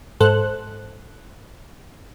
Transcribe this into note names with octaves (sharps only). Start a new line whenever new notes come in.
G#2 A4 C5 F#6